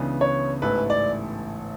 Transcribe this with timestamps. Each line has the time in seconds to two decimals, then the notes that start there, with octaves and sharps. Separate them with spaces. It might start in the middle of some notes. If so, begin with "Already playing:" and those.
Already playing: C#2 C#3 E3 B3 D4
0.21 C#5
0.62 A1 G#2 E3 A3 E4 B4
0.90 D5